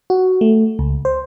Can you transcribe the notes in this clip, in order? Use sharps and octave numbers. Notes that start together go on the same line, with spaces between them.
F#4
A3
C#2
C5